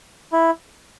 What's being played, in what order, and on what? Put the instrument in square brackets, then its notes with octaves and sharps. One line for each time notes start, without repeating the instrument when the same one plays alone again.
[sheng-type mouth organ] E4